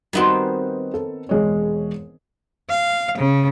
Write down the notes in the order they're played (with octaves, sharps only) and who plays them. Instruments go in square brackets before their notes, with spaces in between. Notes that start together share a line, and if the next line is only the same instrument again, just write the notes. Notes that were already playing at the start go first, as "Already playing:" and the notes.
[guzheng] D#3 B3 C4 [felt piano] G3 D#4 F#4
[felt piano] A4
E1 G#3 C#5
[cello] F5
C#3